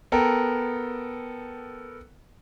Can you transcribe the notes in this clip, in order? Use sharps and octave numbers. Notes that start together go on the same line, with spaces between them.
B3 A4 A#4 G5